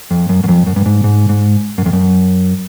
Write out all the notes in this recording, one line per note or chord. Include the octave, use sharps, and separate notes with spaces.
F2
F#2
F#2
F2
F#2
G2
G#2
G#2
G#2
F#2
F2
F#2